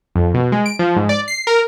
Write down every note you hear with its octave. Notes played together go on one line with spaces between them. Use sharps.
F2
B2
G#3
D7
F3
G#2
D5
C7
A#4